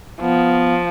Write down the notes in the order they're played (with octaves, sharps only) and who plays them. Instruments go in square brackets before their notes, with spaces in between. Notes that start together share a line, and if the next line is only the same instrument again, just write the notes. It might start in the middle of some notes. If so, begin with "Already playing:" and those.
[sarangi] F3 [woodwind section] B3